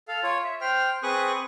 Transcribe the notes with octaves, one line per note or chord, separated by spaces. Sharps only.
A4 F5
F4 C#5
E5
C5 G5 F6
C4 G#4 B4 C#6 D#6 F#6